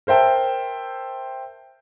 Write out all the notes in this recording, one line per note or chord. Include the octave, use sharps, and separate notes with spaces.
A#4 C5 E5 G5 A5